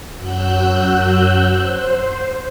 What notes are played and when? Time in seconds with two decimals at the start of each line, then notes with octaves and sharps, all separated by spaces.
0.15 F#2 F#3 F#4 E6 F#6 G6
1.53 C5